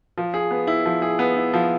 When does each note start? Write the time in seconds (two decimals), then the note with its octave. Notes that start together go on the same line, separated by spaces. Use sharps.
0.18 F3
0.34 G#4
0.51 B3
0.67 E4
0.86 F3
1.02 G#4
1.19 B3
1.36 E4
1.54 F3